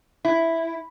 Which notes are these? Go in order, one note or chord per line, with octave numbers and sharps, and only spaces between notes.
E4